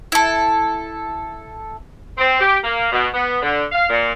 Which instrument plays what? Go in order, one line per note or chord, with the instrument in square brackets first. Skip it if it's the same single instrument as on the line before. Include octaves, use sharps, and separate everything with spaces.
[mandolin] E4 A4
[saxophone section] C4
G4
A#3
B2
B3
D3
F5
A#2